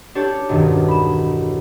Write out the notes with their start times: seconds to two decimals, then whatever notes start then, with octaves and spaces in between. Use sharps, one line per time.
0.15 D4 G4 A4 C#5
0.49 E1 B1 G2 D#3 D4
0.88 B5 E7